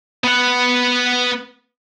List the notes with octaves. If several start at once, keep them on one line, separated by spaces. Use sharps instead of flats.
B3 F#5